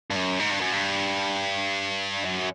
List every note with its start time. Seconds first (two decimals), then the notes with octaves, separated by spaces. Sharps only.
0.10 G2
0.16 F#2
0.40 G#2
0.51 G2
0.61 F#2
0.73 G2
2.25 F#2